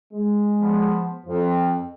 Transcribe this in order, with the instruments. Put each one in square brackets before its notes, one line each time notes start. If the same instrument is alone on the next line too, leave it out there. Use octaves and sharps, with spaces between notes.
[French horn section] G#3
[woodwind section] F3 B3
[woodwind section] F2 [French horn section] F3